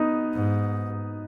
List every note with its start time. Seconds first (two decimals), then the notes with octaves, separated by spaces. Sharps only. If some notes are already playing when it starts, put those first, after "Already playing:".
Already playing: B3 D#4
0.33 G#2